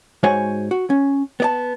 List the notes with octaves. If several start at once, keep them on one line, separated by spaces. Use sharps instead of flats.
G#2 G#3 F#4 C5 C#5 G#5
F#4
C#4
B3 D5 A5